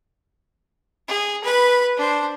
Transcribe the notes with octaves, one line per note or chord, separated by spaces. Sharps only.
G#4
B4 B5
D4 C5